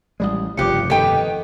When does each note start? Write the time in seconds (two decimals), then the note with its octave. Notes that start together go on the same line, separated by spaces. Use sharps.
0.20 A1 G3 G#3 D5 D#6
0.57 F1 G2 C#3 F4 G4 D6 F#6 C#7
0.90 D#3 B3 D#4 G4 A4 D#5 F#5 G5